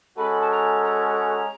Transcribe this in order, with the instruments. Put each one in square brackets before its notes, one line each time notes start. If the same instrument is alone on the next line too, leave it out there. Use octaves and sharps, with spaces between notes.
[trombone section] G#3 C#4 F#4 A4 [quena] B5
[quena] A5
A#5
A#5